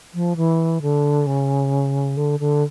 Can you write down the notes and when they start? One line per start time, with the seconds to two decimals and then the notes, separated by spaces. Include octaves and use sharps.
0.14 F3
0.36 E3
0.82 D3
1.27 C#3
2.17 D3
2.40 D3